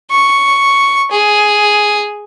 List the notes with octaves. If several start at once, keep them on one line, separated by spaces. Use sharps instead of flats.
C#6
G#4